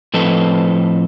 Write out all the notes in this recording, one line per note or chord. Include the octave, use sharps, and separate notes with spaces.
A2 F3 C4 A4 B4 D#5